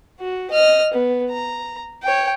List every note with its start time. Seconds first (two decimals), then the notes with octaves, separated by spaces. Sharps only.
0.20 F#4
0.50 D#5 F6
0.93 B3
1.30 A#5
2.03 C#5 G5